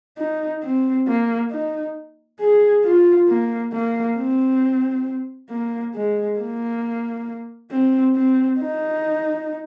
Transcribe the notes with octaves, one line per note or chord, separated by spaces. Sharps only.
D#4
C4
A#3
D#4
G#4
F4
A#3
A#3
C4
A#3
G#3
A#3
C4
C4
D#4